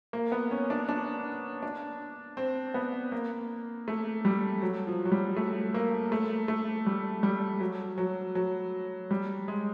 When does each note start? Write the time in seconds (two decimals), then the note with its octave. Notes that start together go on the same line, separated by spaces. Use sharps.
0.13 A#3
0.32 B3
0.51 C#4
0.70 D4
0.89 D4
1.63 D4
2.37 C4
2.74 B3
3.12 A#3
3.88 A3
4.25 G3
4.62 F#3
4.87 F3
5.05 F#3
5.12 G3
5.36 A3
5.74 A#3
6.12 A3
6.48 A3
6.86 G3
7.23 G3
7.60 F#3
7.98 F#3
8.35 F#3
9.11 G3
9.48 G#3